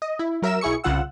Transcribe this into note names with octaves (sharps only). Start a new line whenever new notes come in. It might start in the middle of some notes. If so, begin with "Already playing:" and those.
D#5
E4
F#3 A#4 E5 E6 E7
B1 E4 G#4 C#6 C#7
C2 C#3 F4 F#5 E6